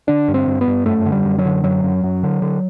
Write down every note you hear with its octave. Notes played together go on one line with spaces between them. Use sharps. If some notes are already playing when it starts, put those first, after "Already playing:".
D3 D4
G2
C4
G2
B3
G2
F#2 A3
D3
G3
F#2
F#3
D3
F#2 F#3
F#2
F#2
D3
D3